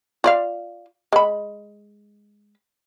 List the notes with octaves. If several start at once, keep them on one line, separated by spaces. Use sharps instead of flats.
F4 D5 F5
G#3 B5